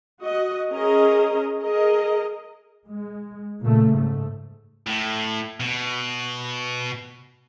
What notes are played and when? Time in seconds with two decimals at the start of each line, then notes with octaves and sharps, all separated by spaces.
0.22 F#4 D#5
0.72 C#4 G#4 A#4 D#5 A#5
1.62 G#4 A#4 D#5
2.88 G#3
3.63 A#2 C#3 A3
3.94 G#2 A3
4.87 A2
5.60 B2